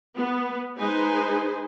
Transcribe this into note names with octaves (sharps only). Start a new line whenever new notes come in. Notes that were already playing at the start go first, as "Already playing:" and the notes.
B3
G#3 D#4 B4 C5 G#5